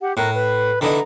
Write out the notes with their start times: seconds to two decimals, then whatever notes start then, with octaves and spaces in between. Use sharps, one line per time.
0.01 G4 F#5
0.17 A2 A#4 F#6
0.34 B4
0.81 D3 E3 D#4 A#5